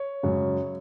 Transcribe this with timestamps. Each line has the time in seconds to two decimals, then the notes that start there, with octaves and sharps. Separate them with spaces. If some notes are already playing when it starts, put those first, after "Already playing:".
Already playing: C#5
0.23 F#2 C#3 G#3